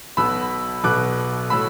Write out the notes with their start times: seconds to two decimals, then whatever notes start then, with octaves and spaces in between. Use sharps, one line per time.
0.17 B1 B2 B3 B5 E6
0.84 B1 B2 B3 D6 F#6
1.50 A2 F#3 B5 E6